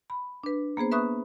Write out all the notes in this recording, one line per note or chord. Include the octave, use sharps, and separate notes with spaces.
B5
D4 B4
A#3 B3 G#4 C5
B4 E5 B5 C#6 D#6 F#6